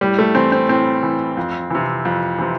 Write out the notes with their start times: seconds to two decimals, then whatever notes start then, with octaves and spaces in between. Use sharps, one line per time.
0.01 A2 G3
0.19 A3
0.35 E3 C4
0.52 C4
0.69 A2 C4
1.03 E3
1.37 F2
1.70 C3 E3
2.05 F2
2.38 C3 E3